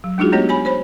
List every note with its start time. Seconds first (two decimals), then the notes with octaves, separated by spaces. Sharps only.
0.04 F#3
0.18 G#3 D4 D#4 F4 F#4 G#4
0.32 A3 B3 G4 C#5 D#5
0.49 C#5 G#5 B5
0.65 C5 C#5 B5